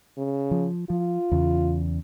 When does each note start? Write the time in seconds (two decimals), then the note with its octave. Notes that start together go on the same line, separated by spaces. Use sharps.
0.18 C#3
0.51 F3
0.90 F3 F4
1.32 E2 C#3